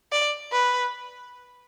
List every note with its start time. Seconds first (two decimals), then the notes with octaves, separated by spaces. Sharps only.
0.12 D5
0.53 B4